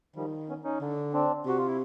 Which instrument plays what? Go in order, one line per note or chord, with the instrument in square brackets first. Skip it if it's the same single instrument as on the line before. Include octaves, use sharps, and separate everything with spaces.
[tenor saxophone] D#3 [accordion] F3 G3
[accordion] B3 C#4
C#4 D#4
[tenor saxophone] D3
[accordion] C4 D4
[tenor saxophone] C3 [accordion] F#4
[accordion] F4
E4